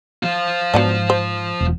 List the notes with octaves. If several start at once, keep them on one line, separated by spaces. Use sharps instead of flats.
F3 F4
G#2 F#3 B3 D4
C5
E1